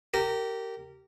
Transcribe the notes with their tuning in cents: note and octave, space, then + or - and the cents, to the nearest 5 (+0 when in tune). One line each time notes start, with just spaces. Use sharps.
G4 -20 A#4 -20